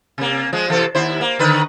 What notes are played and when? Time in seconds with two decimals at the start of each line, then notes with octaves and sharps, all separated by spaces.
0.18 C3 A#3
0.53 F3 G#3
0.68 C3 E3 A4
0.95 D#2 E4 C5
1.21 A#3
1.39 D3 D#3 B4